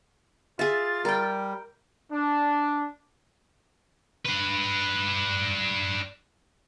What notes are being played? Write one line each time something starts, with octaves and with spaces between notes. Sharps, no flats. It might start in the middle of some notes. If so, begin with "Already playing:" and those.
F4 G#4 E5 A6
G3 A#4 G5
D4
D4 B4